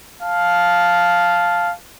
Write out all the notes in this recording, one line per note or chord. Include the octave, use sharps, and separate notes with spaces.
F5 A5